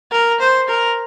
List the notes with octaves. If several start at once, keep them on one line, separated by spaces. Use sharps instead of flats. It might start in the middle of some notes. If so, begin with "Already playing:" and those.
A#4
C5
A#4